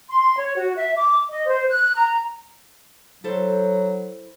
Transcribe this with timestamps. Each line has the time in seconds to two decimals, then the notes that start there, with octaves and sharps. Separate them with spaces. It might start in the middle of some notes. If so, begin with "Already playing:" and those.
0.09 C6
0.37 C#5
0.57 F#4
0.76 E5
0.96 D6
1.29 D#5
1.47 C5
1.70 F#6
1.95 A#5
3.24 F#3 E4 A4 C5